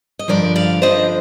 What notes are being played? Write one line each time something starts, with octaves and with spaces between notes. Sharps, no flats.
D#5
G2 D3 F3 A#4 D5
D5 F5
G2 D3 F3 C5 D#5